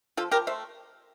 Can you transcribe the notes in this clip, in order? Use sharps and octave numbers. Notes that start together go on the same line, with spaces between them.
F3 F4 A4
F3 G4 A#4
A3 C5 E5